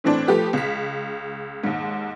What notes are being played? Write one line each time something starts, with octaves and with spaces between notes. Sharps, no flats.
A2 E3 C4 D4
F3 A3 G4 B4
C#2 B6
D#2 G#2